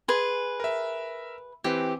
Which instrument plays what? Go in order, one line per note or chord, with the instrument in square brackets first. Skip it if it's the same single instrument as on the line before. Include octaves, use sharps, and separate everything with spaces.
[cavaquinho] G#4 B4 C6
[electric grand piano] A#4 E5
[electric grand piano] E3 C4 B4 [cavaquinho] G4